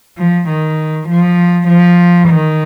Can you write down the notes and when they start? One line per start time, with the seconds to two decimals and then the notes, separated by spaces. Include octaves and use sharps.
0.18 F3
0.49 D#3
1.09 F3
1.68 F3
2.29 D#3